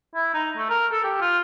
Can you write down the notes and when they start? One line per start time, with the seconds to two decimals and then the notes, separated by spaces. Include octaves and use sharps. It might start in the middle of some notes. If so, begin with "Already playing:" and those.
0.15 E4
0.34 D#4
0.57 A3
0.69 A#4
0.92 A4
1.03 G4
1.21 F4